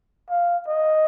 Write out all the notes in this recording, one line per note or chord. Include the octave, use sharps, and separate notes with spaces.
F5
D#5